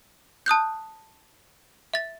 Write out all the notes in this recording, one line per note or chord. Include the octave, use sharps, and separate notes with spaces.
A5 D#6 F#6 G6
E5 A6